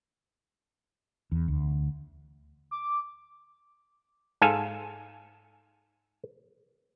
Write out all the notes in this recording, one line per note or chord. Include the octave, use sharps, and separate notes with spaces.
E2
D2
D6
G#2 A4 F5 G#5